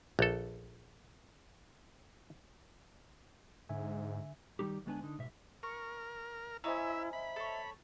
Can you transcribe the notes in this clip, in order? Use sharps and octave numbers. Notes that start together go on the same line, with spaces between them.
A#1 A4
G#2 D3 E5 G#5
D#3 G3 D#4 G4
D2 G#3 B3 D4 G#5
D3 D#4
G#2 B2 E5
A#4 C#6
C#4 E4 C5 D#5 E5 G#5 A#5
E5 B5
A4 C#5